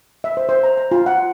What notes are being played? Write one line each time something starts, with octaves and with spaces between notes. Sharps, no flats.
E5
C5
C5
A#5
A#5
F4
F#5